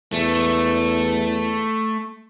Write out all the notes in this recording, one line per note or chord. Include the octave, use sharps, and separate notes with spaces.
E2 A3